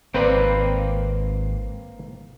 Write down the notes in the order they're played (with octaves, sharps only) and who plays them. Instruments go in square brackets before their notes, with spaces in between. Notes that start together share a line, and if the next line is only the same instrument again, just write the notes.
[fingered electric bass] G#1 [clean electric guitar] A#3 F5 G5 [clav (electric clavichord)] C4 B4 D5